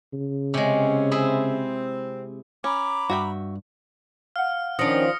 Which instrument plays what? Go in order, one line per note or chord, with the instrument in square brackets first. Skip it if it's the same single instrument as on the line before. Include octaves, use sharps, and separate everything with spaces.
[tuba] C#3
[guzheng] C3 G#3 [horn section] C#4
[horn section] C4 [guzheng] E4 G#4 E5
[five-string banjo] C#4 [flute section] A#5 B5 [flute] D6
[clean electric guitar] G2 [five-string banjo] F#4 E5 G5
[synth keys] F5 F#5 [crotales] F6
[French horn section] D#3 C#4 [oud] F3 D4 [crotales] D#6 A#6 C#7